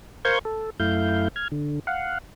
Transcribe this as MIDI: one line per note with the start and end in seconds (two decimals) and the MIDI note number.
0.25 0.39 70
0.25 0.39 72
0.25 0.39 77
0.25 0.39 85
0.25 0.39 91
0.25 0.39 92
0.45 0.70 69
0.80 1.28 42
0.80 1.28 57
0.80 1.28 64
0.80 1.28 77
0.80 1.28 91
1.36 1.48 89
1.36 1.48 92
1.52 1.79 50
1.87 2.18 77
1.87 2.18 78